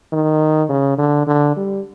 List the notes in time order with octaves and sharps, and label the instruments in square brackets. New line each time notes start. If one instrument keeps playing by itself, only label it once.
[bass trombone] D#3
C#3
D3
D3
G3